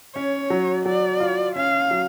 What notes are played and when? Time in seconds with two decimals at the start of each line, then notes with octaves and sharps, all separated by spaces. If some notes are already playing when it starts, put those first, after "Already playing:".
0.15 C#4 C#5
0.50 F#3
0.85 F#3 D5
1.20 F4
1.55 C#4 F5
1.91 F#3